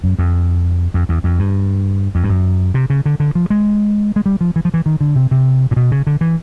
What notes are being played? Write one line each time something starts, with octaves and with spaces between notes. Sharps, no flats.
F#2
F2
F2
E2
F2
G2
F2
G2
F#2
C3
C#3
D3
D3
F3
G#3
G#3
G3
F3
E3
F3
E3
D#3
D3
C3
C3
A#2
B2
C#3
D3
E3